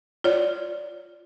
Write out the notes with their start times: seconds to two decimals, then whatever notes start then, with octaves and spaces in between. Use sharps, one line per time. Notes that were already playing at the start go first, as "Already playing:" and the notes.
0.24 F4 C#5 D5